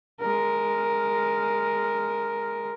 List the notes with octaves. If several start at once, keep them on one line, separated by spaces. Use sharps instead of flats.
G#3 A#4